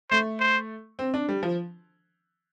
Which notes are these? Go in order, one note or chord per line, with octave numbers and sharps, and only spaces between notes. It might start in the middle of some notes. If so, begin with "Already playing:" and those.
A3 C5
C5
C4
D4
G3
F3